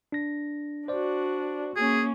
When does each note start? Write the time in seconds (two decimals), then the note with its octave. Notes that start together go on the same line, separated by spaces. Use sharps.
0.12 D4 A#6
0.88 D4 F#4 C5 D5
1.76 A#3 C#4 G#4